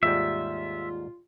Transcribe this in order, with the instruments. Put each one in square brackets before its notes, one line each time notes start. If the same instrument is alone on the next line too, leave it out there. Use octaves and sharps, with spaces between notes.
[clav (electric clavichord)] D#2 G#2 G3 [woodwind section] F4 [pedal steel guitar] E5